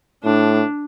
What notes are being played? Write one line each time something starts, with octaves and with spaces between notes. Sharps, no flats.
A2 D4